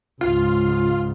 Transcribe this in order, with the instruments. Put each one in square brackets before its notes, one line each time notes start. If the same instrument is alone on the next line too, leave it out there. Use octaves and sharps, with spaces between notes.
[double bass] C#2 G#2 [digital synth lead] F4